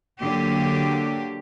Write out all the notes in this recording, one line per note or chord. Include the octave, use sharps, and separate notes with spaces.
D3 F#3 A#3 G4